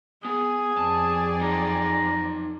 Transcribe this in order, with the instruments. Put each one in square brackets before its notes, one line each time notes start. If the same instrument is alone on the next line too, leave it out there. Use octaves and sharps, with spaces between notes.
[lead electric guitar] B3 [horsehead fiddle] G#4 [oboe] D#6
[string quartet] F2 C4 D5 [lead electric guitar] A5
[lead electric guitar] D#4 A4 [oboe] A#5